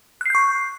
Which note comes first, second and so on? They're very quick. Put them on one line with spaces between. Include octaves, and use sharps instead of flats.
F#6 C7 G6 C#6